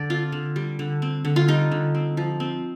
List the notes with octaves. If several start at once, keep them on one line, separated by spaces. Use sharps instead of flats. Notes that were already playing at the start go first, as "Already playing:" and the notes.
Already playing: D3 D5
C4 F4
D3
G3
D3
C4
D3
F4
G3 D#4
D3
C4
F3
C4